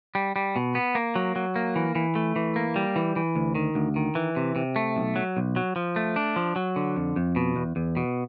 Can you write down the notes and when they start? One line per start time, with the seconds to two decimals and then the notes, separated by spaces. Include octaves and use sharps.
0.15 G3
0.36 G3
0.56 B2
0.75 B3
0.95 A#3
1.16 F#3
1.36 F#3
1.56 A#3
1.76 E3
1.95 E3
2.15 A3
2.36 E3
2.56 A#3
2.76 G3
2.96 E3
3.16 E3
3.36 D2
3.55 D#3
3.75 D2
3.96 D#3
4.15 E3
4.36 C3
4.56 C3
4.76 A3
4.96 B1
5.16 F#3
5.37 B1
5.56 F#3
5.76 F3
5.96 A3
6.16 D4
6.36 F3
6.56 F#3
6.76 D3
6.96 F2
7.16 F2
7.36 B2
7.56 E2
7.76 E2
7.97 B2